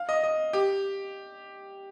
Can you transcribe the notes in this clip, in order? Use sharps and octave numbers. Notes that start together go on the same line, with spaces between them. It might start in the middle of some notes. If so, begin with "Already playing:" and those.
Already playing: F5
D#5
D#5
G4